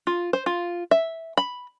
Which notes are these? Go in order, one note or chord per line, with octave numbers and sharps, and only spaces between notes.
F4
C5
F4
E5
B5